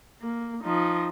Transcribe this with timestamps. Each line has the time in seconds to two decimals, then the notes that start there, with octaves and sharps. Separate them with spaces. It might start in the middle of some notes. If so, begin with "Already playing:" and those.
0.21 A#3
0.64 F3 D#4